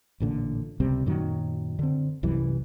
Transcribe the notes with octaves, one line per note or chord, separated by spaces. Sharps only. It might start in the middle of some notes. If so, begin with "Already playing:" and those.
A1 A#2 D3
C#2 C3 G3 C4
F#2 A#2 D#3 F#3
D3 C4
C2 F#2 E3 G3